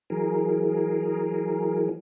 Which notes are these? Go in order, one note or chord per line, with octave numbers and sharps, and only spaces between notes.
E3 F#3 G#4 A#4